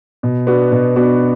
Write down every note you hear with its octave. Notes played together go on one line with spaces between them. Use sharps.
B2
B3 D4 F#4
B2
B3 D4 F#4